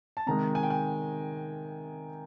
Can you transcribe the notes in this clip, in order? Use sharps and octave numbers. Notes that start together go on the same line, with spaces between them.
A5
C3 D#3 G#3 A#5
G#5
G5
G#5